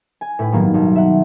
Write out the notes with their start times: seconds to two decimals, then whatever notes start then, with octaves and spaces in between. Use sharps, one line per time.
0.21 G#5
0.39 A2 B4
0.52 G2 D#3 F#3 A#3 B3
0.74 B1
0.96 E5 F#5